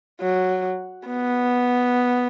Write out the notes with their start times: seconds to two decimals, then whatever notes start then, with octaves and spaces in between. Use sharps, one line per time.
0.21 F#3
1.07 B3